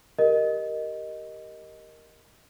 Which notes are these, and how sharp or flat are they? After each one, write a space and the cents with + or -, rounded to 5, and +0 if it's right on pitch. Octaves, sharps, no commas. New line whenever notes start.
G4 +0 A#4 +0 D#5 +0